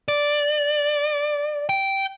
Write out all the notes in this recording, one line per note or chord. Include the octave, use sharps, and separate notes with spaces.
D5
G5